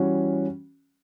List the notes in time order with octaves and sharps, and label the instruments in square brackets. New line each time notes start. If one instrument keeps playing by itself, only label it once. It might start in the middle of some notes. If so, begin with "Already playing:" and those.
Already playing: [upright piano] E3 G3 C#4 F#4